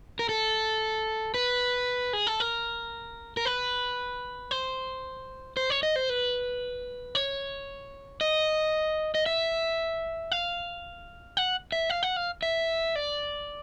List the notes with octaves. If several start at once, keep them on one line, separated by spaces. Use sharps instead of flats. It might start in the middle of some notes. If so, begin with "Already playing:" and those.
A#4
A4
B4
G#4
A4
A#4
A#4
B4
C5
C5
C#5
D#5
C5
B4
C#5
D#5
D#5
E5
F5
F#5
E5
F5
F#5
F5
E5
D5